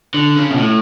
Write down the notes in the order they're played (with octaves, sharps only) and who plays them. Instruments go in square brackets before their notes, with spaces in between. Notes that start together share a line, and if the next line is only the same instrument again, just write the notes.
[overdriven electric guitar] D3
C#3
B2
A2